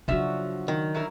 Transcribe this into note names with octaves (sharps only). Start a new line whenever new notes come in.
C#3 F3 F#3 D4 D#4 F#4 E5
D#3
F#3 E4 A#4